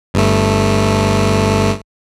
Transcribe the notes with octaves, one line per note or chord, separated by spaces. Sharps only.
G1 G2 A3